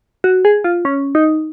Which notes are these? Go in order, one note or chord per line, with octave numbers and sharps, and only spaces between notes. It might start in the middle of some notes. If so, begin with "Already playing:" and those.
F#4
G#4
F4
C#4
D#4